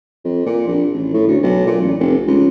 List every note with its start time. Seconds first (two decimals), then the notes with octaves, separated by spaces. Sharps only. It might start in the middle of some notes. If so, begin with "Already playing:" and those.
0.25 F2
0.46 A#2
0.67 A#1
0.94 A1
1.14 A2
1.28 D2
1.43 B1
1.67 A#2
1.81 A1
1.99 F1
2.27 C#2